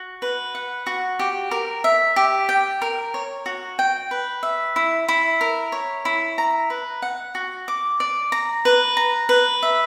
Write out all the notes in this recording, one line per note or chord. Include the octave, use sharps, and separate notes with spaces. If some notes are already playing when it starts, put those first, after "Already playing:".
Already playing: F#4
B4
F#5
F#4
G4
A#4
E5
G4
G5
A#4
C#5
F#4
G5
B4
E5
E4
E4
A#4
C#5
E4
A#5
B4
F#5
F#4
D6
D5
A#5
B4
A#5
B4
E5